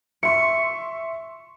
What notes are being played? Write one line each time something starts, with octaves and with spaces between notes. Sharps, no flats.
E5 C6 C#6 C#7